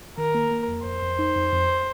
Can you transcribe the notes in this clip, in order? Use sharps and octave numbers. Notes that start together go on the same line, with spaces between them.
D#3 A#4
A#3
A#3
F2
F2 C5
F2
D#4
F2
F2